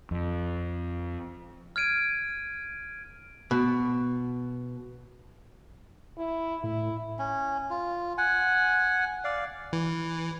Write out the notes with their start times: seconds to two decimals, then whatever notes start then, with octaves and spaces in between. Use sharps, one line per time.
0.11 F2
1.76 F6 G#6 D7 D#7
3.51 B2
6.18 E4
6.64 A2 E4
7.19 C#4
7.70 F4
8.18 F#5 G#5
9.24 D5 F5
9.73 E3